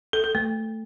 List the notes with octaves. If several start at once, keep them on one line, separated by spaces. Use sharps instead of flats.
A4
A4
A3